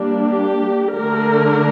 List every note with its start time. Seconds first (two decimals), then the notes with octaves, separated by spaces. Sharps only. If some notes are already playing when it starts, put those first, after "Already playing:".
Already playing: G3 A#3 D4
0.30 G4
0.94 D3 A3 D4 A#4